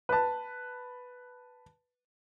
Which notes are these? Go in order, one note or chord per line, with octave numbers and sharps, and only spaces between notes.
B4 A5